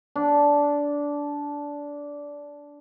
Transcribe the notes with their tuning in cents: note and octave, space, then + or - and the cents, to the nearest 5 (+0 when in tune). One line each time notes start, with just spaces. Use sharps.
D4 -15